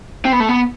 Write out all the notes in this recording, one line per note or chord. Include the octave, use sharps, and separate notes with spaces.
C4
B3
A3
B3